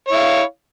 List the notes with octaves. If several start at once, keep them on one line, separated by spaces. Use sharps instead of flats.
E4 C#5 F5